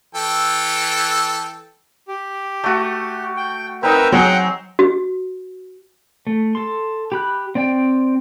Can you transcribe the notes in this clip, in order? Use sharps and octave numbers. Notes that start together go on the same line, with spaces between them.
E3 A4 G5
G4
A3 F#4
G5
C4 D#4 A#4 B4 E5
F#3 G#4 F#5 G5 C6
F#4
A3
A4 C6
G4 B5 F#6
C4 D5 G5